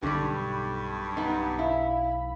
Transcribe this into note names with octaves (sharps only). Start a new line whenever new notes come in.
B1 G2 D3 G3 B5 C#6
B3 D#4
E4 F5